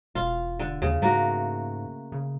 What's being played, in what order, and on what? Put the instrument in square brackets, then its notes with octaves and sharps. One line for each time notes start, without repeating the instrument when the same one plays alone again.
[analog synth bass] E1 [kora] F4
[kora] D3
[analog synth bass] D#2 [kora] C#3
[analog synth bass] G#2 [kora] A3 A#3 F#4
[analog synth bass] C#3